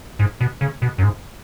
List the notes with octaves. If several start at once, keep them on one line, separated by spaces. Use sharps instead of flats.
G#2
B2
C#3
B2
F#2
G#2